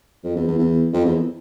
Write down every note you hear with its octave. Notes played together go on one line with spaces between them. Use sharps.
F2
E2
E2
E2
F2
E2